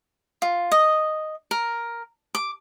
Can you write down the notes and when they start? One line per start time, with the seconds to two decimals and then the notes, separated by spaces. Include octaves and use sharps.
0.42 F4
0.72 D#5
1.51 A#4
2.35 D6